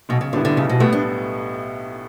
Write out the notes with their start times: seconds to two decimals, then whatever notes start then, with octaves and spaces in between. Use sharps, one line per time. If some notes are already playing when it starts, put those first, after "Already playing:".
0.09 B1 B2
0.21 C#3
0.33 A2 D3 G3 B3 E4
0.45 D3
0.57 B1 C#3
0.69 B2
0.80 A2 G3 A3 B3 E4
0.92 D4